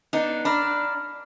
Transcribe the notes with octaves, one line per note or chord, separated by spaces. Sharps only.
B3 D4 D#4
D4 A#5 B5 F6